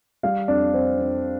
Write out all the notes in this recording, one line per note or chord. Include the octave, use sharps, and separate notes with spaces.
G3 F5
F2 D4
F2 C4
F2